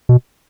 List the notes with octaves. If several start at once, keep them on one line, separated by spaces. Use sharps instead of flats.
B2